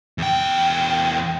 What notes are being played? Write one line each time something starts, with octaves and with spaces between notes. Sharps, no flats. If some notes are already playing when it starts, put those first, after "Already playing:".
E2 G5